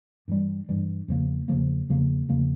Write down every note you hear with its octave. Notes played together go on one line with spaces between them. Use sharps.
G2 E3 G3
G2 E3 G3
E2 C#3 F3 A#3
E2 C#3 F3 A#3
E2 C#3 F3 A#3
E2 C#3 F3 A#3